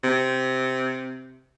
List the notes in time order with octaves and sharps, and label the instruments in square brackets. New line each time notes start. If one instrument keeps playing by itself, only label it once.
[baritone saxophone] C3